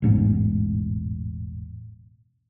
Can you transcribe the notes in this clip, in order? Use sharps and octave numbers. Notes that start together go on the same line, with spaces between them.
E1 A1 G#2 B2